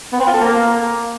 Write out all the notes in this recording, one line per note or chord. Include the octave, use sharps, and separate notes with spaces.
B3
C4
F4
A4
A#3